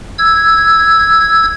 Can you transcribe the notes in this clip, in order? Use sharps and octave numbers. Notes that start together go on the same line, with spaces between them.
E6 G#6